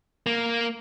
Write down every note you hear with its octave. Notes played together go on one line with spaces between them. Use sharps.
A#3